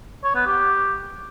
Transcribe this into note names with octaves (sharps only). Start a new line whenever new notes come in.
C#5
B3
G4